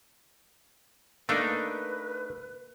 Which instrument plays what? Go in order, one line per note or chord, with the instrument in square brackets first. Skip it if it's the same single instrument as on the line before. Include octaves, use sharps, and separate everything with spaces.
[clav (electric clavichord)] A3 D4 D#4 [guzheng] A#3 [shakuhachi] B4